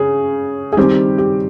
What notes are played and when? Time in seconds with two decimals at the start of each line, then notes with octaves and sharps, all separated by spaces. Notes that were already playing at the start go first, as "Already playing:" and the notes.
Already playing: C#3 G#4
0.73 G#4
0.77 D#3 G3 C4 G4
1.18 G4